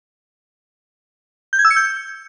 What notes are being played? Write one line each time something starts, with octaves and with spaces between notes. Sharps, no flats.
G6
G#6
E6
C#7
G6